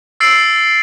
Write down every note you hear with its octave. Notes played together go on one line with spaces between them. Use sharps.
E6 A6 C7 D7 F#7